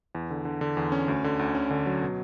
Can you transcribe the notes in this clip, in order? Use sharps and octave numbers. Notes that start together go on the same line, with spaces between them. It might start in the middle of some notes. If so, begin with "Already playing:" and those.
E2
D3
D3
D3
E2
C#4
D2
D3
D2
C#4
D3
F#3
B2